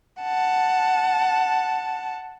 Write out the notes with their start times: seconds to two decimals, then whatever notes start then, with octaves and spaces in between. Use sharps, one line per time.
0.22 F#5 A5